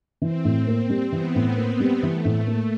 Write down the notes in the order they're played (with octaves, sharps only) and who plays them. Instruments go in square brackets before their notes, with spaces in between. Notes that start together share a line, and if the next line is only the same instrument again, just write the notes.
[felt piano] E3 [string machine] C4
[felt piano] A2
A#3
G3
[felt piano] E3 [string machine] B3
[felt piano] A2
A#3
G3
[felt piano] E3 [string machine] A3
[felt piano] A2
A#3